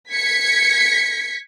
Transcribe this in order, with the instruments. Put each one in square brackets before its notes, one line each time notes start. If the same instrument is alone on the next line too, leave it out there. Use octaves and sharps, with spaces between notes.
[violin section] G#6 B6 C#7